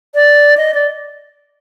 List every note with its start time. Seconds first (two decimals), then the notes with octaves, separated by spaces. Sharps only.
0.15 D5
0.57 D#5
0.74 D5